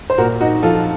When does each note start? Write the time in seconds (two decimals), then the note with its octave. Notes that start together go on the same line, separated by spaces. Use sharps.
0.10 C5
0.18 A#2 F#4 A#4
0.41 D#4 F#4
0.63 F3 F4 A4